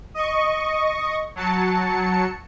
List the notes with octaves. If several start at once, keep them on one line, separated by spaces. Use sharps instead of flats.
D#5 C#6
F#3 A5 C#7